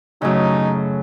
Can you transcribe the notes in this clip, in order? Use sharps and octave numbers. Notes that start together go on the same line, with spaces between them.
F#2 A2 C#3 D#4